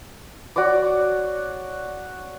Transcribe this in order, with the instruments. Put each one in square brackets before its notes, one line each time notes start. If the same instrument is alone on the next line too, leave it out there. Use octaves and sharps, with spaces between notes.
[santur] F#4 C#5 D5 D6